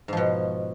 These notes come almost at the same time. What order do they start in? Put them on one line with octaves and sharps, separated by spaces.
G#2 F3 B2